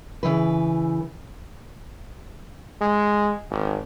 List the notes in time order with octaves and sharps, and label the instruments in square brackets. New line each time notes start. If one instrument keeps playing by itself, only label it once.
[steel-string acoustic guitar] C#3 E3 B4
[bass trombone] G#3
G#1